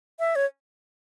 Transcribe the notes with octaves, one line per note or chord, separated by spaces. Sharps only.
E5
C#5